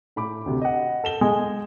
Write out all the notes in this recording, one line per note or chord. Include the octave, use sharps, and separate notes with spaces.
A2 B5 D6
D2 C3
D#5 F#5
A4 E7 G7
G#3